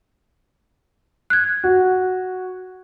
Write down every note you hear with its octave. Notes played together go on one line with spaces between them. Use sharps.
F#6 G#6
F#4